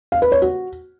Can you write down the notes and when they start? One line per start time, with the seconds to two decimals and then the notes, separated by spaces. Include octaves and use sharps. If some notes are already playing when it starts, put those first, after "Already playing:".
0.12 F5
0.22 B4
0.32 C#5
0.42 F#4